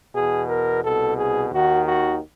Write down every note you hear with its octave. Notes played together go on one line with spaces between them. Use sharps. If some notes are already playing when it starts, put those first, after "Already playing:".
E2 B2 G#4
A#4
C2 B2 A4
G#4
D#2 D#3 F#4
F#4